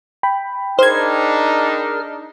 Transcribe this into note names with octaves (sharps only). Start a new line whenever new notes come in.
G5 B5
D4 D#4 G#4 A#4 C5 F6 G#6